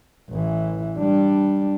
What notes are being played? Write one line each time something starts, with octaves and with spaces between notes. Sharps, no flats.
A1 E3
G3 D4